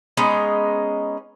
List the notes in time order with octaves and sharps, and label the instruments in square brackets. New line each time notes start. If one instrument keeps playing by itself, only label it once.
[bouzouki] G#3 B3 C#4 D#4